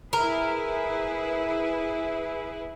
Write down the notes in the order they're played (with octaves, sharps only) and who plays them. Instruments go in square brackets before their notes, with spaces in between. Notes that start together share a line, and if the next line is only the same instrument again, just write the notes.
[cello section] E4 G#4 B4 [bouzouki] A#4